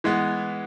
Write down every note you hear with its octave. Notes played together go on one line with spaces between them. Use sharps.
E3 G#3 B3